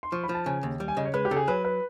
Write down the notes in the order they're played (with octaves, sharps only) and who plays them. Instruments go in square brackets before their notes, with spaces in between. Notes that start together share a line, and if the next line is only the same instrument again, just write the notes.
[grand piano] C6
[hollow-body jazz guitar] F3 [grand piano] C#6
[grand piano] B5
[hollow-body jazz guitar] F3
[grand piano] A5
[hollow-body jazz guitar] C#3 [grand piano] G#5
[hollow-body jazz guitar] D#2
G3
[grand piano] G#5
[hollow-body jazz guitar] C#3 [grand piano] D#5
[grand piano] C#5
[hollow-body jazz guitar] G#3 [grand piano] B4
[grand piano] G4
[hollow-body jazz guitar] C#3 [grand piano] A4
[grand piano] G#4
[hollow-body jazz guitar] F#3 [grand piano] B4
[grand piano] B4